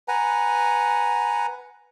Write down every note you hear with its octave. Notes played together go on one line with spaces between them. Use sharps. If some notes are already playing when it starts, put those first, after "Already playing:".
B4 F#5 G#5 A#5